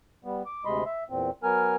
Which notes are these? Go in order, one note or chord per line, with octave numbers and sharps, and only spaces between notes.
G3 B3
D6
D2 C3 G#3 D#5 B5 C6
E5
E2 A#2 C4
F#3 B3 A#4 G#5 F6